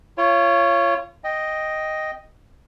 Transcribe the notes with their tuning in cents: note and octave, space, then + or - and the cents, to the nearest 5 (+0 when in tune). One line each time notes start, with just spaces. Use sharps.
F4 -30 C#5 +0
D#5 +0 G5 +0